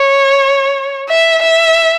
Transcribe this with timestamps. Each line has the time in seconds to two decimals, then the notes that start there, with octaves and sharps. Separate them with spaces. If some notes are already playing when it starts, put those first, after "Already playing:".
Already playing: C#5
1.09 E5
1.42 E5